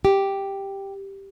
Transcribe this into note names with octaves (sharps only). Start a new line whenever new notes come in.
G4